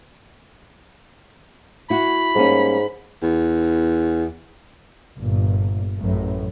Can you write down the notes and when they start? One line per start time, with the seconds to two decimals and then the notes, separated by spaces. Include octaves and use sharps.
1.90 E4 F#4 B5
2.35 G#2 G3 A#3 C#4
3.23 E2
5.17 G1 A#2
5.99 A1 F#2 A2